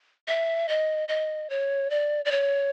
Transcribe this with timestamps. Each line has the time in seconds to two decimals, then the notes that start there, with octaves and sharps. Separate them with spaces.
0.28 E5
0.69 D#5
1.08 D#5
1.50 C#5
1.90 D5
2.25 D5
2.31 C#5